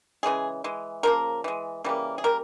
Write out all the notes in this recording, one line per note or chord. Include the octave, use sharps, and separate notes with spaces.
C#3 E3 G#3 G#4
E3 G#3
C#3 F3 A#3 A#4
E3 G#3
C#3 E3 G3 A#3
G#4
C#3 G3 A#3 A#4